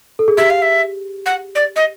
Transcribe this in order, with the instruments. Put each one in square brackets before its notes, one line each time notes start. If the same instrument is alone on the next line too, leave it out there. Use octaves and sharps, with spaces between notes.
[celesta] A4
G#4
[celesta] G4 [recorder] E5
[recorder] F5
E5
F#5
D5
D#5